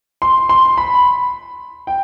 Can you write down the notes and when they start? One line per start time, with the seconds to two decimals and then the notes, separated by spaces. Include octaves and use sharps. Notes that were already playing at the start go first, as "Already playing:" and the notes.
0.22 C6
0.49 C6
0.77 B5
1.87 G5